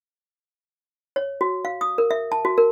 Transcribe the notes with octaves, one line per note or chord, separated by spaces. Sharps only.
C#5
F#4
F5
D#6
A#4
E5
A5
F#4
A#4